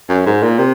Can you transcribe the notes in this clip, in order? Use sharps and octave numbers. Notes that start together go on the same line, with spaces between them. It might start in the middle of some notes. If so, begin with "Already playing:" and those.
F#2
G#2
A#2
C3